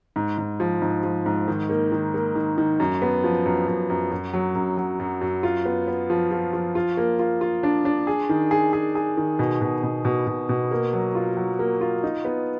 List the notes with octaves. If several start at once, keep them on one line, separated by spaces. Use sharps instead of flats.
G#2
G#2
F3
G#2
F3
G#2
D#3
A#3
D#3
A#3
D#3
D#3
F#2
B3
F3
F#2
F#2
F#2
F#2
F#3
F#2
F#3
F#2
F#2
F4
B3
B3
F3
F3
F3
F4
A#3
F4
F4
D4
D4
G#4
D#3
G#4
G#4
G#4
D#3
B2
B2
B2
B2
B2
B2
A#3
F#3
F4
F#3
A#3
F4
D#4
B3